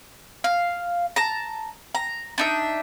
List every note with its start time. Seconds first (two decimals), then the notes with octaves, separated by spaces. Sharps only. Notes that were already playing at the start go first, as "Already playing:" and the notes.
0.44 F5
1.16 A5 A#5
1.95 A#5
2.38 D4 D#4 E5